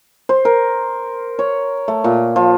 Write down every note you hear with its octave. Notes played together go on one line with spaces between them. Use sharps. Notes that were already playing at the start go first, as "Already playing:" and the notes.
C5
A#4
C#5
A3
A#2
F3